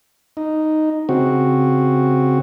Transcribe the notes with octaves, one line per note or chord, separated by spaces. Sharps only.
D#4
C#3 C4 F#4